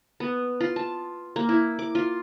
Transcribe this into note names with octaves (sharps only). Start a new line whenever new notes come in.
B3
F4
A5
A#3
E4
D6
F4